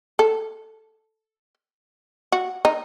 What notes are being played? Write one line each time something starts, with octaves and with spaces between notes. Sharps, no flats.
A4
F#4
D#4